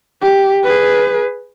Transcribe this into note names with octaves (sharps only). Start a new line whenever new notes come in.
G4
G#4 B4